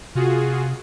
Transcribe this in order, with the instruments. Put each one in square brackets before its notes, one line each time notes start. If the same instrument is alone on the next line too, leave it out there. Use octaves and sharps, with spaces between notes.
[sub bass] C3 [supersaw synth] F4 F#4 G#4